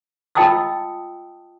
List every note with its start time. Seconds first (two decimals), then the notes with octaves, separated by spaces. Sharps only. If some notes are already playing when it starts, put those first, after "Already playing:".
0.35 F4 D#5 G5 A5 D#6 E6